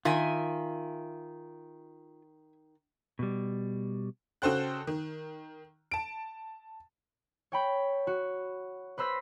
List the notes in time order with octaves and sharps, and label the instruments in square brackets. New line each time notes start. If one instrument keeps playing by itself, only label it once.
[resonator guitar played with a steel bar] D#3 [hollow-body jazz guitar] F4 [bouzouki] E5 G#5
[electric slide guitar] B2 G3
[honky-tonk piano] C#3 F#4 A4 C5 G5 F#6
D#3
A5 D7
[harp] C#5 G5 B5
F#4
B4 C5 B5 E6 A#6 B6